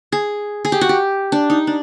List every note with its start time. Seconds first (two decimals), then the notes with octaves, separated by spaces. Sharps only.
0.12 G#4
0.65 G#4
0.72 G4
0.81 F#4
0.89 G4
1.32 D4
1.50 D#4
1.67 D4